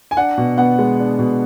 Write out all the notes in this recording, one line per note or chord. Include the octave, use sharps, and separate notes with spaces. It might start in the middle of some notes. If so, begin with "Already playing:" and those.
G#5
D4 F#5
B2
B3 F#5
G#3
D4
B2